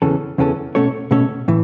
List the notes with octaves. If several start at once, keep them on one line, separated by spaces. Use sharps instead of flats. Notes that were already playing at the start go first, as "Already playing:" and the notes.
E2 C#3 E3 C#4 A4
E2 C#3 E3 C#4 A4
B2 A3 C#4 A4 C#5
B2 A3 C#4 A4 C#5
A2 E3